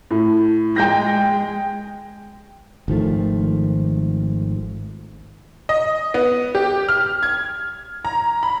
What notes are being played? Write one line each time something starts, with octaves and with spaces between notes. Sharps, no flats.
A2
G#3 G5 G6 A#6
G#1 D#3 F3 A3
D#5
B3
G4
F6
G#6
A#5
B5